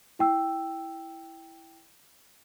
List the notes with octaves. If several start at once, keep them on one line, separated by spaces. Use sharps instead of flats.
E4 G5 E6